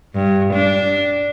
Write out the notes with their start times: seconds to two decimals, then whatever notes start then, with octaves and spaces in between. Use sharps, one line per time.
0.15 G2
0.54 D4